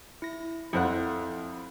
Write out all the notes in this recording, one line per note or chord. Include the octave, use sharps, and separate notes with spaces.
E4 A#6
F2 E4 C5 F#5